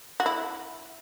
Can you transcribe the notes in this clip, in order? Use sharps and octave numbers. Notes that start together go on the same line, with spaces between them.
F#4
E4